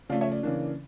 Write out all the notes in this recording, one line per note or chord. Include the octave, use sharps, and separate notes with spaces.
C#3 F3 A3 D5 F5
C#5 E5
D5
C#3 E3 A#3 D4